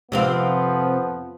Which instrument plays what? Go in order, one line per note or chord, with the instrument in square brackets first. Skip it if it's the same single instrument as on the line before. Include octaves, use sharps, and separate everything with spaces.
[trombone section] F2 F3 B3 [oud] C3 C4 F5